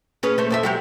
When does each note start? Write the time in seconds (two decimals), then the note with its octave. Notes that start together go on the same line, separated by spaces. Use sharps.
0.23 C#4 G#4 B4
0.38 A3 C5
0.50 F2 A4 E5
0.63 F#3 G#3 G4